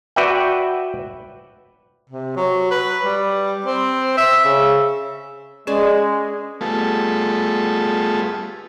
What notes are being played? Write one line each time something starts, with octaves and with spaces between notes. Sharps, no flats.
F#4 B4 D5 E5 G5
C3
F#3
B4
G3
C4
E5
C#3
G#3 C#4 G#4 B4 D5
G3 A3 B3 F4 G#4 A4